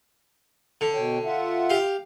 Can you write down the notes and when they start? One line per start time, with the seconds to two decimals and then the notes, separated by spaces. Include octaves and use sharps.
0.81 D3
0.94 B2 C#5 G5
1.26 F4 E5 F#5
1.70 G4 F5